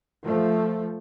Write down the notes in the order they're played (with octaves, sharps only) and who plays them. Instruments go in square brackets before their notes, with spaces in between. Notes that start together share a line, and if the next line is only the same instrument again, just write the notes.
[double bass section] F3 A3